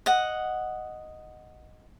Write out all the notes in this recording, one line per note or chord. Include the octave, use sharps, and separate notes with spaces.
D#5 F#5